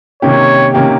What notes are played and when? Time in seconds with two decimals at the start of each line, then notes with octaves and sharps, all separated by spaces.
0.22 C3 D#3 A#3 C#4 G4 C#5
0.74 C3 D#3 A#3 C#4 G4